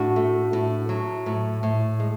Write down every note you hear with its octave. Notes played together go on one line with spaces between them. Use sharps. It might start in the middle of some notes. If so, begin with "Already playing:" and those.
Already playing: A2 D4 F#4
A3
A2
F#3
A2
A2
G#3